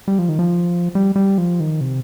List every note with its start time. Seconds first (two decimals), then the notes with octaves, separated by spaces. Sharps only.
0.08 G3
0.19 F3
0.29 D#3
0.39 F3
0.95 G3
1.16 G3
1.38 F3
1.60 D#3
1.81 C3